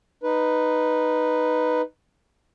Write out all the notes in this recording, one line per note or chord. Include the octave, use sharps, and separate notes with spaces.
D#4 B4